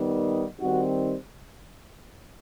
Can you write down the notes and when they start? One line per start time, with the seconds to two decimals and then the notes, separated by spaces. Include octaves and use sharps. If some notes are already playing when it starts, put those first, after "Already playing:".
Already playing: D#3 G3 B3 D#4
0.58 D#3 G3 C4 D#4 F#4